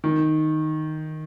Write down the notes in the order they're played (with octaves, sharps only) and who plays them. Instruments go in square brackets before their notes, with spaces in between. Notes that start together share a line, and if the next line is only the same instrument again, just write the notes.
[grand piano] D#3